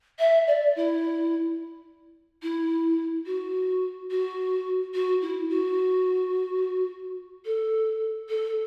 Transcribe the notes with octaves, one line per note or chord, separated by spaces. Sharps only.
E5
D5
E4
E4
F#4
F#4
F#4
E4
F#4
A4
A4